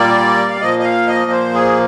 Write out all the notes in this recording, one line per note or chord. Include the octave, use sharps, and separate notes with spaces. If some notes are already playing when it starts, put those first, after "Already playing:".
Already playing: A#2 G3 A#3 D5
F5
A#2 F3 A#3 D#5
D#5
F5
D#5
C5
G#4